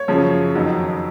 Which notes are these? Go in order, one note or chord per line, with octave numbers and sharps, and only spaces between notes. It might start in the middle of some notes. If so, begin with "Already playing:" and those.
Already playing: C#5
F#2 C#3 F3
F2 D#3 F#3